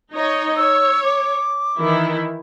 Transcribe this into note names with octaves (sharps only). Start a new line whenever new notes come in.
D#4 C#5 D#5
C#5 E6
D6
D#3 E3 E4